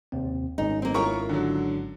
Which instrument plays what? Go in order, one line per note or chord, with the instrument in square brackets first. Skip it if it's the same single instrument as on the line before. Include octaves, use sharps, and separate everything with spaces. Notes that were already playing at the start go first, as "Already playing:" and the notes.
[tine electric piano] D#2 C3 C4
[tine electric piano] G#1 G#2 C#4 [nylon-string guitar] D#4
[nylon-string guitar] A#3 C4
[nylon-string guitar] E4 F4 C#5 [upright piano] A#4 A#5 C#6
[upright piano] D3 F#3